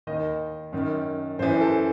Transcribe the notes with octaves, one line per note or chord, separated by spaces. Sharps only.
D#2 D#3 D#5
F#2 D#3
F#2 E3 C5
C5
A4